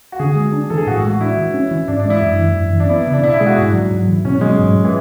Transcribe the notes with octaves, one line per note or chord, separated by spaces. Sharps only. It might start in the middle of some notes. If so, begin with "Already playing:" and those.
F#4
D3 G#4
G#3
D4
E3 A4
G#4
A2 F#4
G#3 F#4
D4 E4
E3
C#4
E3
G#2 D4
D4
G#3
E4
F#2
E3
F#2
E3
D4
B3 E4
C#3
D4
B2 E4
E4
G#3 G#4
F#4
G#2
F#3
G#2
E3
B2 C#4
F#3 G#3
G#2
G#3
E3